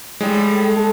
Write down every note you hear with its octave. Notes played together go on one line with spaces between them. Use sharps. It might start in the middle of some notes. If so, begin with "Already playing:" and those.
A2 G3 G#3
A4